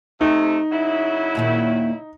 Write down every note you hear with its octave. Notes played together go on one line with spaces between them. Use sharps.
C3 A3 D#4
C#3 F#3 E4
D#2 A#2 D#3